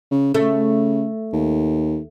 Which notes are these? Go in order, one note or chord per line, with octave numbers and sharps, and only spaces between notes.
C#3
C#3 A3
D#2